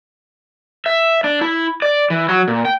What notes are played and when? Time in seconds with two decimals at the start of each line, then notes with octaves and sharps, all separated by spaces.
0.86 E5
1.24 D4
1.41 E4
1.82 D5
2.10 E3
2.29 F#3
2.48 A#2
2.65 G5